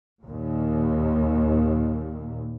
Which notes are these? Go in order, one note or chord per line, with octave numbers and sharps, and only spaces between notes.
D#2 A#2